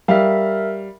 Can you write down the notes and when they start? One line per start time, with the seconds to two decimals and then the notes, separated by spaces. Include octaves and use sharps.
0.08 G3 A#4 E5 F5